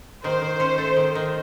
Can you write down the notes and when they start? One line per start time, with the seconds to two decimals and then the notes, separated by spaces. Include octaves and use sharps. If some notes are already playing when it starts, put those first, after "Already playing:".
0.24 D#3 C5
0.42 D#3
0.60 C#4
0.78 A3
0.96 D#3
1.15 D#3